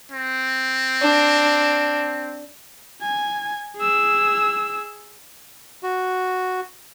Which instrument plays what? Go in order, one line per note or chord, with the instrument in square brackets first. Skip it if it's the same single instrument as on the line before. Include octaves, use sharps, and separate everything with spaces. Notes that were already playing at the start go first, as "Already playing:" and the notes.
[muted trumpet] C4
[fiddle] D4
[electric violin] G#5
G#4 E6
[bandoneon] F#4